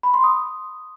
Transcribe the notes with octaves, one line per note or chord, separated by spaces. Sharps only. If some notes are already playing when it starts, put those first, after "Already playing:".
B5
C6
D#6